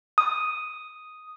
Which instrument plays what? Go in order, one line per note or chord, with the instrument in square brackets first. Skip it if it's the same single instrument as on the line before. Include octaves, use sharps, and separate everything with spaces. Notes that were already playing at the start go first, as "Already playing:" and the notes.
[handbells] D#6